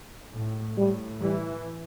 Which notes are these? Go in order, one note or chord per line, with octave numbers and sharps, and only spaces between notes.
A2
A2 G3
E3 G3